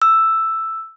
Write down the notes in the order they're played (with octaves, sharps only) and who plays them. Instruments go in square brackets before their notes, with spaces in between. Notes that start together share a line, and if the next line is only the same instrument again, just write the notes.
[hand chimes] E6